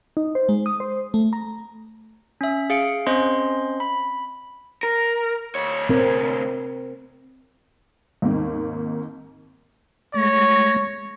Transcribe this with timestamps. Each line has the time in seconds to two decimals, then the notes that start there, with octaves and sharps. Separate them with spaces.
0.17 D#4
0.35 C5
0.49 G#3
0.66 D#6
0.80 C5
1.14 A3
1.33 A#5
2.41 C#4 E5
2.70 G#4 F5 C#7 D7
3.06 C4 C#4 C5 D#5 C6
3.80 B5
4.83 A#4
5.55 D2 C#5
5.89 C4 A#4
8.22 D#2 G#2 A#3 C4
10.14 G#3 A3 C#5 A#6